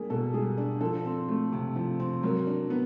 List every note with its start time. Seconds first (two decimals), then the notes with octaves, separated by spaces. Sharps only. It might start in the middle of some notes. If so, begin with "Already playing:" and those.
Already playing: G3 A#3 D4 G#4
0.10 B2 A4
0.33 G3 G#4
0.58 D4
0.81 F3 A4
1.05 C4
1.29 A3
1.52 C3
1.76 F3
2.00 C4
2.23 F#3 A#4
2.47 D4
2.70 B3